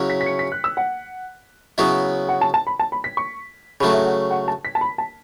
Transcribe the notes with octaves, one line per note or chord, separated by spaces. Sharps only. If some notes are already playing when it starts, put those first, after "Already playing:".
Already playing: C#3 F#3 C#4 E4
B6
B6
C#7
B6
F#6
E6
F#5
C#3 F#3 B3 E4
F#5
A5
A5
B5
A5
B5
B6
C#6
C#3 F#3 A3 B5
E5
F#5
F#5
A5
B6
A5
B5
A5